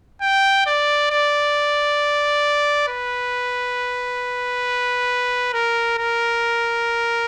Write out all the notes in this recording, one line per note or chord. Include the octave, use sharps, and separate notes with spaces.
G5
D5
D5
B4
A#4
A#4